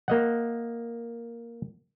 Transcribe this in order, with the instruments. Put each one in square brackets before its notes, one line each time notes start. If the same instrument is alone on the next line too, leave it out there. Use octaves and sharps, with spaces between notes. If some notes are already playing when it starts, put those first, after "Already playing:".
[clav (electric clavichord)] A#3 D#5 F#5